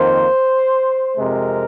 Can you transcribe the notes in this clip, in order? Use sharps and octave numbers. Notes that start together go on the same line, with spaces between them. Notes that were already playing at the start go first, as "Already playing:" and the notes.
Already playing: F2 D#3 A#3 C5
F2 C3 G#3 A#4